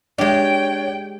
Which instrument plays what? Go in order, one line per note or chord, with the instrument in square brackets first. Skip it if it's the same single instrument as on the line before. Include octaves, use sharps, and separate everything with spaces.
[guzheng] G#3 G4 [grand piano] D4 [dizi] C#5 [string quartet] G5